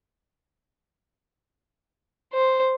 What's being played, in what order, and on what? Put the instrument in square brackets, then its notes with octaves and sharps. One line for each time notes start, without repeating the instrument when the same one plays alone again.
[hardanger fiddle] C5